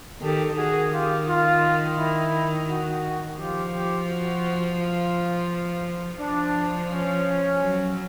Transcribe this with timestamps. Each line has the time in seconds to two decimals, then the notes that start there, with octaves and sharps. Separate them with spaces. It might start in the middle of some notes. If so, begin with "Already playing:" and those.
0.21 D#3 G4 A4
0.56 D#3 F#4 G#4
0.91 F4 G4
1.26 F4
1.97 E4
2.68 F#4
3.38 F3 F4 G4
3.73 F4 G4
4.08 F#4
4.79 F4
6.19 F3 D4
6.90 C#4
7.60 F#3